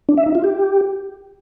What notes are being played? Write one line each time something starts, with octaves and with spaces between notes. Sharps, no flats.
D4
E5
D#4
F4
G4